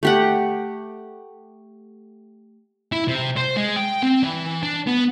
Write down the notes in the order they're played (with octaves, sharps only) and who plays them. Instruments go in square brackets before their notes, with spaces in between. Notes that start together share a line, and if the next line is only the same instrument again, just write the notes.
[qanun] A3 G4 F#5
[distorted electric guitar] E4
C3
C5
G#3
G5
C4
E3
D4
B3